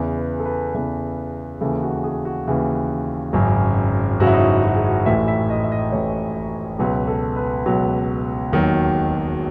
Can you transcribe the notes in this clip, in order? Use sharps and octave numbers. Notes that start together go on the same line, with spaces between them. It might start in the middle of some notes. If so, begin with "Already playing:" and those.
Already playing: E2 C#3 E3 B4
B4
A4
B4
E2 C#3 E3
D#2 C#3 E3 A4
F#4
G#4
F#4
D#2 C#3 E3
G#1 F#2 C#3 F#3
G#1 F#2 C#3 F#3 F#4
E4
D#4
E4
F#4
G#4
F#4
A1 A2 E3 E5
E5
D#5
E5
D#5
A1 A2 E3 C#5
C#2 B2 F#3 B4
A4
B4
C#2 B2 F#3
E1 D#2 D#3 F#3